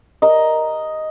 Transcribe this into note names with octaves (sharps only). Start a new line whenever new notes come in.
A#4 D#5